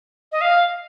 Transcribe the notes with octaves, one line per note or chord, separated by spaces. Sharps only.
D#5
F5